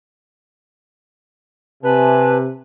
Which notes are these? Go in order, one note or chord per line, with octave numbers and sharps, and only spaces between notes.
C3 B4 G#5 A5